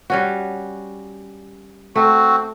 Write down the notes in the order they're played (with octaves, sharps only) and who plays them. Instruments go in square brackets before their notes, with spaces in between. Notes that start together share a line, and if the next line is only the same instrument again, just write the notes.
[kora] G3 C#4 F#4
[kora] A3 [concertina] C4 F#4